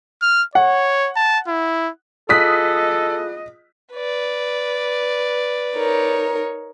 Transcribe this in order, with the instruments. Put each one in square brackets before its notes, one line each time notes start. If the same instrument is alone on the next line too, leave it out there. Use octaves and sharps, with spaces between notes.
[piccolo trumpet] F6
[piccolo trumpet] C#5 [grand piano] F#5
[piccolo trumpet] A5
E4
[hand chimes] F4 G#4 F#6 [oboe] A4 [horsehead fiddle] D#5 [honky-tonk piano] D#6 B6
[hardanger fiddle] B4 D5
[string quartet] D#4 A#4 C#5